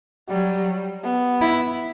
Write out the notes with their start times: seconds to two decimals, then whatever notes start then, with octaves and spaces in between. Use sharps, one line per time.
0.29 F#3 G3
1.04 B3
1.41 E4